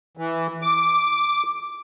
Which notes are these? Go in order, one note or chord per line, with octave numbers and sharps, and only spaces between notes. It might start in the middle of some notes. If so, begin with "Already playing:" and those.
E3
D6